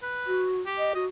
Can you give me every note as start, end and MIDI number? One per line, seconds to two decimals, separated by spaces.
0.03 0.47 71
0.27 0.61 66
0.66 0.91 67
0.78 0.93 75
0.95 1.07 66
0.95 1.04 75